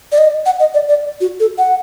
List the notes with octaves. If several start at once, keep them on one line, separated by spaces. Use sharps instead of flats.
D5
D#5
F#5
D#5
D5
D5
F#4
A4
F#5